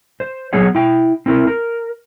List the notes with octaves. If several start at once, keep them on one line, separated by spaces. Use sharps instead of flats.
C5
F#3 B3 G#4 C#5 F#5
E4 G5
C4 E4 A#4
A#4